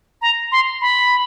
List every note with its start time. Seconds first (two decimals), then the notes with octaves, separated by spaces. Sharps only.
0.22 A#5
0.52 C6
0.81 B5